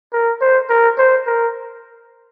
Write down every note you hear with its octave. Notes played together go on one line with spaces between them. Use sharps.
A#4
C5
A#4
C5
A#4